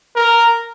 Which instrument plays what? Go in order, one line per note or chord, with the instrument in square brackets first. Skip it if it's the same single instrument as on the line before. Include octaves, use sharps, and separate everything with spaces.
[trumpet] A#4